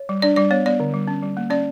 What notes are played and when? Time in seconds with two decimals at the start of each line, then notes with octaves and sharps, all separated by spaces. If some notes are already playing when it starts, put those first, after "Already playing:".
Already playing: C#5
0.09 G3
0.22 D4 D5
0.36 G3 D5
0.51 B3 C#5
0.66 B3 D5
0.80 D3
0.94 G3
1.08 C#4
1.23 G3
1.37 A#3
1.50 C#4 D5